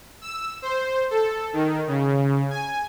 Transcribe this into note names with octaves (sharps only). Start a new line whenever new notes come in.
E6
C5
A4
D#3
C#3
G#5